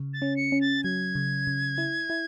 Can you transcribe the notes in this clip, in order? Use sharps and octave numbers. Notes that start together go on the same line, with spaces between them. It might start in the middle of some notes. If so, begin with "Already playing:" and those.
Already playing: C#3
A6
C#4
C#7
C#4
A6
F#3 G#6
C#3
C#3
E4
E4